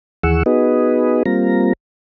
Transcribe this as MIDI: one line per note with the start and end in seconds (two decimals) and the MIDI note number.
0.23 0.43 39
0.23 0.43 52
0.23 0.43 68
0.23 0.43 78
0.23 0.43 85
0.23 0.43 88
0.46 1.23 59
0.46 1.23 63
0.46 1.23 66
0.46 1.23 68
0.46 1.23 71
0.46 1.23 75
1.26 1.73 55
1.26 1.73 58
1.26 1.73 60
1.26 1.73 65
1.26 1.73 82